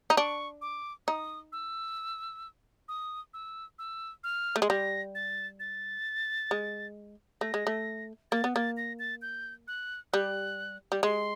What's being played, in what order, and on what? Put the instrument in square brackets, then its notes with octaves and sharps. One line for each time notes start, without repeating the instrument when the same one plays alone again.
[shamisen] D#4
[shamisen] D4 [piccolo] C#6
[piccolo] D6
[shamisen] D#4 [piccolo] D#6
[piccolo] E6
D#6
E6
E6
F6
[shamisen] A3
G#3
[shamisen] G3 [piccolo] A#6
[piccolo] A6
A6
[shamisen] G#3
[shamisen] A3 [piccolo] A#6
[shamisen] G#3
A3
[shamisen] A#3 [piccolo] A6
[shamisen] B3
[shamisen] A#3 [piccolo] A6
[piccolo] A#6
A6
G6
F#6
[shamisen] G3 [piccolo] F#6
[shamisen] G3
[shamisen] G#3 [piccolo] C6